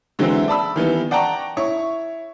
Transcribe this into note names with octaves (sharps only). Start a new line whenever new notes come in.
D3 E3 F#3 G#3 C4 E4
D5 A5 B5 E6
D#3 E3 G3 B3
D5 F#5 G5 A5 A#5 C#6
E4 C#5 C#6